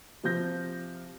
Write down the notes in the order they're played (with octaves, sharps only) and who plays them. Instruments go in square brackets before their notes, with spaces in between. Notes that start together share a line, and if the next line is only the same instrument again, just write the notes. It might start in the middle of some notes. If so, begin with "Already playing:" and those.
[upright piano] C3 F3 F4 G6 A#6